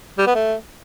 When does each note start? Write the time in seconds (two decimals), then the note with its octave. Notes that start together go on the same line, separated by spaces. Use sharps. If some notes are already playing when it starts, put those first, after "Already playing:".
0.18 G3
0.26 B3
0.35 A3